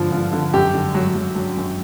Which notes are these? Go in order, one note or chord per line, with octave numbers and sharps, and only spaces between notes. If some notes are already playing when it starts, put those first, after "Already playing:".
Already playing: G2 D3 F3
F3
D3
F#2 G4
D3
F#3
F#3
F#3
F#2